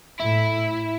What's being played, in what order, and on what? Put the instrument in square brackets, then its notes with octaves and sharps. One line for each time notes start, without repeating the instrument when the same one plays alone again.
[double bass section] A2 [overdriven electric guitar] E4